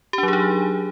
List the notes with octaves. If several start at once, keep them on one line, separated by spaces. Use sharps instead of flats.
F#3 D4 D#4 G4 G#4